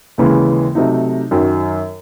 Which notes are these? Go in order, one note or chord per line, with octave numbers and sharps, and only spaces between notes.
D#2 C#3 E3 G#3
C3 F#3 A3 D#4
F#2 D#3 F#3